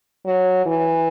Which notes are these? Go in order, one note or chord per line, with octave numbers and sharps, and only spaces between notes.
F#3
E3